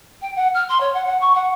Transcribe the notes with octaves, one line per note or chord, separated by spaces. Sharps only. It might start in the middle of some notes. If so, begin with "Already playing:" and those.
G5
F#5
F6
C6
C#5
F#5
F#5
C#6
F#5